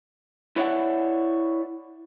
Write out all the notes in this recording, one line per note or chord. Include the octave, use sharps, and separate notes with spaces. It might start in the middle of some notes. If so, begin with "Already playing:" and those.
E4 B4 C#5 D5 E5 F#5